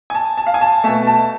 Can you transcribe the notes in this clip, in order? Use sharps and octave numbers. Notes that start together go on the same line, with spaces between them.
G#5
A5
A5
F5
G#5
A5
B2 A3 A5
A5